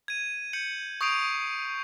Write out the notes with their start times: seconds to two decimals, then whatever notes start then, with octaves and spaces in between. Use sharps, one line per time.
0.08 G#6 D#7
0.53 G6 C#7 F#7
1.01 C#6 D#6 G6 C7 D7 F7